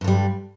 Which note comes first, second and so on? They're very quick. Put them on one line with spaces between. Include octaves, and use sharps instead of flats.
G2 D3 G3